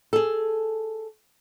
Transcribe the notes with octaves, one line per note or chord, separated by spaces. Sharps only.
G#4 A4